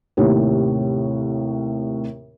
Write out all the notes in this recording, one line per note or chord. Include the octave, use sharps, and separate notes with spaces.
D#2 A2 C3